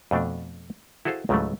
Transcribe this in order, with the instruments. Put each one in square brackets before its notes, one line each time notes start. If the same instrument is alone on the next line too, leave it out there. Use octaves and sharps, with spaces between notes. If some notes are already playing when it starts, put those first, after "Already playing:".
[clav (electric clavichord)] F2 B2 A3 D4
E4 F#4 G#4 A4 C5 F5
C#2 G#2 C#3 E3 F#3 A3